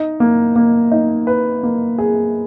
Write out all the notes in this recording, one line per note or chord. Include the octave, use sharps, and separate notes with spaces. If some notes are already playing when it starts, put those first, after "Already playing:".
Already playing: D#4
A#3
A#3
D#4
B4
A#3
G#4